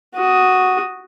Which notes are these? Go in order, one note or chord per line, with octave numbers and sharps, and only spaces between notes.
F#4 D#6